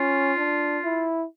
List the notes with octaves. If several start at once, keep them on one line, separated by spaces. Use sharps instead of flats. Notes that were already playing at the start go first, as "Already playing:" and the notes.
Already playing: C#4 F4
D4
E4